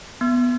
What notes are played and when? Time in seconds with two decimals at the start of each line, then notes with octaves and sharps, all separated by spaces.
0.21 B3